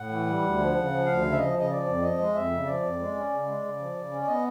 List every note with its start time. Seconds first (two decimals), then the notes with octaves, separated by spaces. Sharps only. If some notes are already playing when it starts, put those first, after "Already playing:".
Already playing: A2 F#5
0.09 E3
0.26 G3
0.42 D2
0.58 F3
0.74 C#3
0.90 F3
1.06 D2 F5
1.21 C#3
1.31 E5
1.38 F3 D#5
1.54 C#3 D#5
1.70 F3 D5
1.87 F2
2.02 F3 D#5
2.19 G#3
2.34 F2 E5
2.50 C#3
2.66 F3 D5
2.82 F2
2.99 G#3
3.15 C#4
3.31 C#3
3.47 G#3
3.63 C#3
3.79 F3
3.95 C#3
4.11 C#4
4.22 D5
4.27 B3 D#5